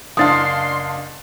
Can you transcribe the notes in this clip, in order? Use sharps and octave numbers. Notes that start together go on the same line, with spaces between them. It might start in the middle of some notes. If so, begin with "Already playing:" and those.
F#1 D4 F5 C6 D#6 A6